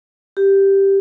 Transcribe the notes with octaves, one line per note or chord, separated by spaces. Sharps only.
G4